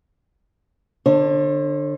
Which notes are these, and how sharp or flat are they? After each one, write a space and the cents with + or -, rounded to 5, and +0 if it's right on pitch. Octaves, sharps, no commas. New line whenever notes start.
D3 +15 C#5 -45